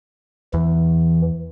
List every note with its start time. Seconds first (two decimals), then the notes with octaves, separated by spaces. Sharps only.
0.54 E2 E3